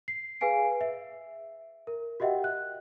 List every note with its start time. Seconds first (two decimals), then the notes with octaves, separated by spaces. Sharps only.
0.08 C7
0.41 G#4 B4 F5 G#5 C7 D7
0.81 E5
1.87 A#4
2.20 F#4 G4 D#5 E5 F#5 G5
2.44 F#6